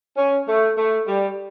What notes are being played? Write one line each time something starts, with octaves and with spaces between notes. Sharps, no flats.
C#4
A3
A3
G3